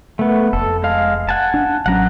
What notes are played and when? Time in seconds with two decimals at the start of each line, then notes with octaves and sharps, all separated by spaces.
0.19 A3 B3
0.53 F1 A4
0.84 G#3 F5
1.29 F#5 G#5 A5
1.54 D4
1.86 A1 F#3 C#4 F#5 A#5